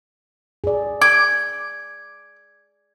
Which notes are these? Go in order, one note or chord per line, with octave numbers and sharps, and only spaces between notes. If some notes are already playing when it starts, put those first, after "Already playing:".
G#4 D5
D6 G#6